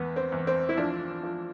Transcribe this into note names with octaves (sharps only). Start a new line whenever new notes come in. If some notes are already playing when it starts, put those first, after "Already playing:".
Already playing: E2 B3
C4
E2
C4
E4
F3 D4
F3